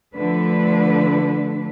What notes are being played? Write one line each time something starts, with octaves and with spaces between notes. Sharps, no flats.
D3 F3 A3 D4 B4